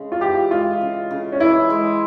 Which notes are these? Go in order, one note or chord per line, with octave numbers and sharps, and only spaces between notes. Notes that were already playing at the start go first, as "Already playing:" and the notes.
Already playing: C#3 G#3
F4
E3 G4
G#3 F4
C#3
C#3
C#4
E3 E4
G#3